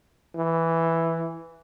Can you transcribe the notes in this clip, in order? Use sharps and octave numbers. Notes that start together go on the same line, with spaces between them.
E3